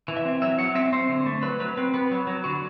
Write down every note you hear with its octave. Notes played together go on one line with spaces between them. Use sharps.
E3
E5
C4
F#3 E5
F#3 F#5
C4 E5
C4 C5
D3
A3
F#3 B4
F#3 B4
C4 B4
B3 B4
F#3
F#3
D3 F#4